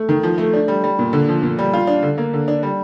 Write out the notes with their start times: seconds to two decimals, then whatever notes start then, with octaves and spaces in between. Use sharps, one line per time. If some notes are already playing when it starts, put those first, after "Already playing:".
Already playing: A3
0.09 D#3
0.23 F3
0.38 A3
0.53 D4
0.68 G3
0.84 G3
0.99 A#2
1.13 D3
1.29 F3
1.42 A#2
1.59 G3
1.74 F4
1.87 D4
2.03 D3
2.18 A#3
2.33 D3
2.48 D4
2.63 G3